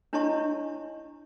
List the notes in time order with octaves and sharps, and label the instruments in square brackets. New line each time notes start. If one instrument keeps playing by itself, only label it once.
[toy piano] D4 E4 C#5 D#5 A5 C#6